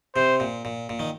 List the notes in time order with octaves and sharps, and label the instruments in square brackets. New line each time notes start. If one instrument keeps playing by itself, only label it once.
[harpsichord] C3 [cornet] C5
[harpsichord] A#2
A#2
A#2
D#3